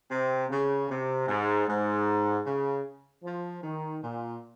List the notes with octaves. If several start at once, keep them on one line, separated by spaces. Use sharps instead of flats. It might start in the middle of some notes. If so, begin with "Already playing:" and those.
C3 C4
C#3
C3
G#2
G#2
C#3
F3
D#3
A#2